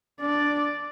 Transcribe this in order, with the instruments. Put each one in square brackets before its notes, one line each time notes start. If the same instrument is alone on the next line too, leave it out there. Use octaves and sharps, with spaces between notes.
[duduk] D4 [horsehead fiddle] D5